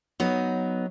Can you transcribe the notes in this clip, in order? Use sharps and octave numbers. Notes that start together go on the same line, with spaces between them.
F#3 B3 D#4